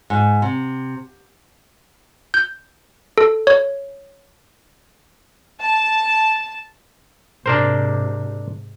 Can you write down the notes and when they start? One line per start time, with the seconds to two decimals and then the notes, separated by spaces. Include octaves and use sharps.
0.10 G#2
0.42 C3
2.34 G6
3.18 A4
3.47 C#5
5.61 A5
7.46 G#2 C3 D4 A#4 C5